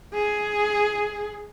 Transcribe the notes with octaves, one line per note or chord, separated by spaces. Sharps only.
G#4